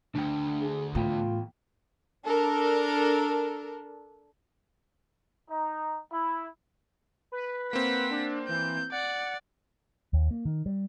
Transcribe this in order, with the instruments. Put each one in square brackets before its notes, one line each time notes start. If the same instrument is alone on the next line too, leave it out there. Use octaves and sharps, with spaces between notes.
[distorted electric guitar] D2 D3 [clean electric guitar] D4 G5
[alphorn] G#4
[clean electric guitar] E2 G5 B5 [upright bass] A2 [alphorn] F4
[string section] D4 A4 A#4
[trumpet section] D#4
E4
[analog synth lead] B4
[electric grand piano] A#3 C4 [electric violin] F#5 B6
[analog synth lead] D4
[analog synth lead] E3 [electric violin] G6
[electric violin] D5 [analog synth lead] F#5
[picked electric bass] D#2
A#3
D#3
G3